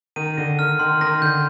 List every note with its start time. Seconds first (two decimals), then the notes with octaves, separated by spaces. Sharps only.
0.16 D#3 D#7
0.37 D3 A#6
0.59 D#3 F6
0.79 D#3 C6
1.01 D#3 A#6
1.22 D3 G6